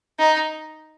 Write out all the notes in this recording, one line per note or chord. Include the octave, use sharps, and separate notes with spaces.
D#4